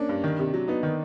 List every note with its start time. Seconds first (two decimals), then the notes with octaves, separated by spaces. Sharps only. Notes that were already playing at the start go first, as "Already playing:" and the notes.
Already playing: A#3 C#4 D4
0.09 G2
0.24 D#3
0.39 C3
0.54 F#3
0.68 B3 D#4
0.83 D#3